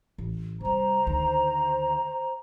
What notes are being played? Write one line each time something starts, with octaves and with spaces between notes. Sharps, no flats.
A1
C3 G3 C5 A#5
D2 D#3